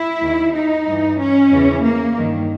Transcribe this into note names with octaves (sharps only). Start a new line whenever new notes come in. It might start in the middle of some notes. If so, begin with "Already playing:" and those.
Already playing: E4
D#2 D#3
D#4
G2 E3
C#4
E2 C#3 E3
A#3
G2 D#3